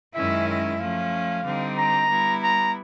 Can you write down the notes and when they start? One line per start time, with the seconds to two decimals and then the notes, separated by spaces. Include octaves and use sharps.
0.14 F#2 D#3 G#3 C#4 E4 E5
0.48 E5
0.79 F3 A3 C#4 F5
1.45 D3 G3 C4 D#4
1.78 A#5
2.09 G3 B3 E4
2.43 A#5